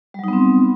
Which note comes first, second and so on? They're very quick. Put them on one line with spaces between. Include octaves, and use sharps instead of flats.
G3 F#3 D#4 B3 C4